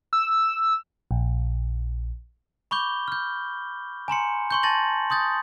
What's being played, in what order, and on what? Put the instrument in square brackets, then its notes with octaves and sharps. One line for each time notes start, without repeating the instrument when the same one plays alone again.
[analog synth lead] E6
[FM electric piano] A#1
[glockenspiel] B5 C#6 D6 G6 G7
F6 G6
G#5 A#5 C6 C#7
C6 C#6 G6
A5 C#6 A6 A#6 F#7
C6 D#6 G6 A6